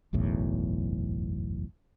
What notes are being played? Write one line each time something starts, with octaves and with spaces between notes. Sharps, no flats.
F#1 B1 E2 A2